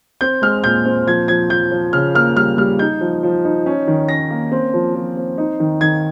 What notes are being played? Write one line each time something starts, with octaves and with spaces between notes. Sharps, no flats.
C4 G6
G#3 F6
A#2 G6
C4
F3 G#6
F3 G#6
F3 G6
F3
C#3 F6
A#3 F6
G3 F6
G3 F6
D#4 G6
F3
F3
D#4
C#4
D#3
C#4 A#6
A#3
C4
F3
F3
C4
D#4
D#3
D#3 G#6